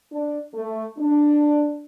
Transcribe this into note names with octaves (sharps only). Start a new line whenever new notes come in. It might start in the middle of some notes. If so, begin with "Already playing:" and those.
D4
A3
D4